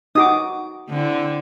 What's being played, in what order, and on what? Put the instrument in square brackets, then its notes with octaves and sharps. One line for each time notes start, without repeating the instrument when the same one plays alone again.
[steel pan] D#4 F#4 D6 [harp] D#6
[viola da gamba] D3 C4 E4